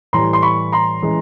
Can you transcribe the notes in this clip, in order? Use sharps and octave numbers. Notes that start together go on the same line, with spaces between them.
A2 E3 G3 A#5 C6
C6
B5 C#6
A#5 C6
E3 G#3 C#4